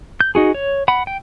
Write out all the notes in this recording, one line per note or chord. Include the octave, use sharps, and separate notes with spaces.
G6
D#4 F#4 G#4
C#5
F#5 B5
G5